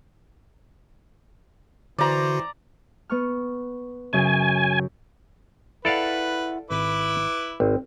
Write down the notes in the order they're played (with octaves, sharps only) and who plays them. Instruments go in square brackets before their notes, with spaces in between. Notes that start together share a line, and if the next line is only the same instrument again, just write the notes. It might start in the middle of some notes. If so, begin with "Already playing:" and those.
[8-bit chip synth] D3 F#4 [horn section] E3 C5 [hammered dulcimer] D5 A#5
[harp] B3 C#6 F6
[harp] F#2 C#3 [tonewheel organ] G#5
[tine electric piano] E4 F#5 [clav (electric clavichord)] A4 D5 F5 [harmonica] B4
[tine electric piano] G#1 [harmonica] E4 B4 D6
[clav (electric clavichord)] G#1 [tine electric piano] C4